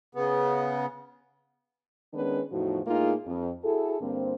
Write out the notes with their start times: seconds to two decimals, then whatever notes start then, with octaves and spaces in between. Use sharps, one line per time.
0.15 C#3 B3
2.14 D#3 G#3 B3 C#4 D4 B4
2.52 E2 A2 F3 D#4 F#4
2.87 A2 G#3 A#3 D#4 F4 G#4
3.26 F2
3.64 E4 F#4 G#4 A4
4.00 G2 D3 A#3 C4